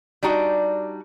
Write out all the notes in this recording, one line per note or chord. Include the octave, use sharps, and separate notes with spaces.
G3 D4 D#4 F#4 D5